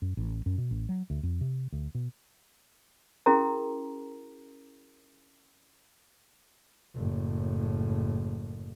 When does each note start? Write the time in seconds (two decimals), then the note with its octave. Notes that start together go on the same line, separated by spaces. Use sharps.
0.02 F#2
0.17 A1
0.46 F#2
0.58 B2
0.71 A1
0.89 F#3
1.10 D2
1.23 F2
1.41 C3
1.72 D2
1.95 B2
3.26 C#4 E4 F#4 G#4 A#4 A#5
6.95 F#1 A2